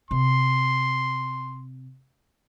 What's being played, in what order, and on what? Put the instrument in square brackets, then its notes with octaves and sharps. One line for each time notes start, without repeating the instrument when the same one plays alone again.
[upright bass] C3 [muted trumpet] C6